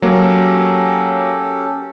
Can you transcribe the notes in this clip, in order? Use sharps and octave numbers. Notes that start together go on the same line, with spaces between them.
F#3 A#3 C#4 G4 A4